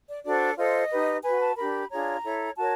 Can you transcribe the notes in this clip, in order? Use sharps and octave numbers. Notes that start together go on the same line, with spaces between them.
D5
D4 F#4 A4 C5 D5
F4 A4 C5 D#5
D#4 G4 B4
F#4 B4 G#5
A5
D4 G4 A#4 B5
D4 F4 G#4 C#5 A#5
E4 A4 C#5
F#4 A#4 C#5 A5